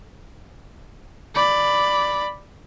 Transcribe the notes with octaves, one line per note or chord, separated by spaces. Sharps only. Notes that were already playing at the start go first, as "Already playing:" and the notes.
D5 B5